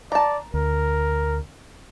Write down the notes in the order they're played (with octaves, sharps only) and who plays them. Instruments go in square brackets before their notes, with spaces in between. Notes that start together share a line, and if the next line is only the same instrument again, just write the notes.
[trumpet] D5 [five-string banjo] A5 A#5
[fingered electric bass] D2 [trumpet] A#4